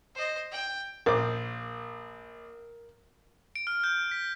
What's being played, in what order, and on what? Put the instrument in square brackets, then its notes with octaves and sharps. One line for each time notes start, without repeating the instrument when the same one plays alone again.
[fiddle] C5 D#5
G5
[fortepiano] A#1 C5 D6 [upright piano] A#4
[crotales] D7
F6
G6
B6